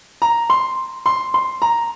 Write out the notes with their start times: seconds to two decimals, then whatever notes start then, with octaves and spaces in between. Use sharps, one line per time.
0.22 A#5
0.50 C6
1.06 C6
1.34 C6
1.62 A#5